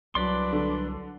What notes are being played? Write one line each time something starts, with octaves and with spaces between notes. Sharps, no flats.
C2 F#3 D4 B4 D5 C6
D3